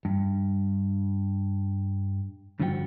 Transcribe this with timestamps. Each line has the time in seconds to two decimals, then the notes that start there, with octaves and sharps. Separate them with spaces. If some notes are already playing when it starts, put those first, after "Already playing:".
0.05 G2
2.60 G2 D3 F3 E4 F#4 G5